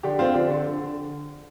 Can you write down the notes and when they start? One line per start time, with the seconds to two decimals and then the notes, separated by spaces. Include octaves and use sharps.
0.03 D3 D4 G4
0.19 D3 C4 F4
0.34 D3 D4 G4
0.50 D3
0.66 D3
0.81 D3